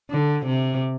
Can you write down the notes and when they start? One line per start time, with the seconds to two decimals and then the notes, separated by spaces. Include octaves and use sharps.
0.10 D3
0.46 C3